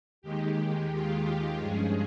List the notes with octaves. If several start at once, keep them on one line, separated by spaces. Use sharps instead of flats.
D#2 D#3 G#3 G4
F4
G2 F3 G#3 C#4 G#4